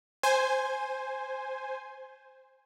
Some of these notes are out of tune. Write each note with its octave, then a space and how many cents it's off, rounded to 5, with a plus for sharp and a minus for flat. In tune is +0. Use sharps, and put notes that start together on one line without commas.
C5 +0 G#5 +0